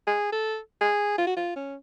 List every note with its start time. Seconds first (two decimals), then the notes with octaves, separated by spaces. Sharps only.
0.07 G#4
0.32 A4
0.81 G#4
1.18 F4
1.27 F#4
1.36 F4
1.56 C#4